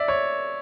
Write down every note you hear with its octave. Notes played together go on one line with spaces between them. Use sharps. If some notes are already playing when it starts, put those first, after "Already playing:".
Already playing: D5 E5
C#5